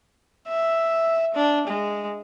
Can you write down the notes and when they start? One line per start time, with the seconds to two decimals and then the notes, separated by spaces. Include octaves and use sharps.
0.48 E5
1.34 D4
1.67 G#3